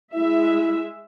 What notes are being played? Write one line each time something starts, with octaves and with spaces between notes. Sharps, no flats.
G#3 E4 E5